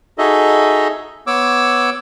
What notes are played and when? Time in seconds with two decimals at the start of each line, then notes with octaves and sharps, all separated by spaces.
0.18 D#4 F#4 G#4 A4 D#5 E5
1.27 B3 C#5 D6 E6